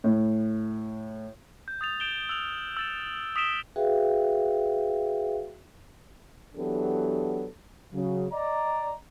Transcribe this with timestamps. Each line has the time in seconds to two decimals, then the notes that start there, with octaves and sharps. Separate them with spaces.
0.04 A2
1.68 G6
1.81 D#6 A6 F7
2.00 G6 D7 E7 F7 G7
2.29 E6 F6 F7
2.77 E6 A6 E7
3.36 D#6 B6 D7 E7 G7
3.76 F#4 G#4 B4 E5 F5 G5
6.56 E3 F#3 B3 D4 G4 A4
7.93 C#3 F#3
8.31 D5 D#5 A#5